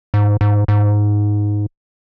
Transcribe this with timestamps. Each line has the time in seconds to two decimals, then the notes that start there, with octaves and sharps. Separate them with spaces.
0.14 G#2
0.41 G#2
0.68 G#2